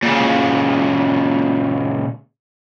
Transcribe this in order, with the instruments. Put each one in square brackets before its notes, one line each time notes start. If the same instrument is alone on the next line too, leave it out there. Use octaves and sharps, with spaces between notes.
[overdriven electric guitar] A#2 C#3